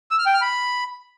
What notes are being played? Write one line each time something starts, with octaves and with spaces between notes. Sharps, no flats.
E6
F6
G5
F6
B5